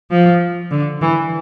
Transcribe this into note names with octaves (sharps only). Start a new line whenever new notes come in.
F3
D3
E3